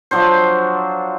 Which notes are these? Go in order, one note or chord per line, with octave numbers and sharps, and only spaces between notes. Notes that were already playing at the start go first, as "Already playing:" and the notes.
F3 F#3 D4 C5